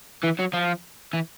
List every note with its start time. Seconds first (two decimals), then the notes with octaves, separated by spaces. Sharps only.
0.24 E3
0.39 F#3
0.53 F3
1.13 E3